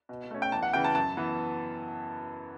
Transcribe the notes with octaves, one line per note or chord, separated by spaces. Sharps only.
B2
A3 C#4
G5
E2 A5
F#5
C#3 E3 G5
A5
F#2 A5
E3 B3